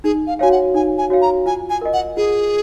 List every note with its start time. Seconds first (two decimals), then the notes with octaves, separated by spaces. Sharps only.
0.04 D#4 G#4
0.27 F5
0.39 F#4 C#5 F5 G#5
0.52 F#5
0.74 D#4 G#5
0.98 G#5
1.10 F#4 C#5 F5
1.22 A#5
1.46 F4 G#5
1.70 G#5
1.81 A#4 D#5
1.93 F#5
2.17 F4 G#4